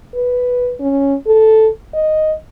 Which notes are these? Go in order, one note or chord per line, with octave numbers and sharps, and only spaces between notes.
B4
C#4
A4
D#5